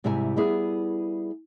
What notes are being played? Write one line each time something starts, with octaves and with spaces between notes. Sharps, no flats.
G#2 C3 G3 E4 E5 G#5
G3 B3 E4 G#4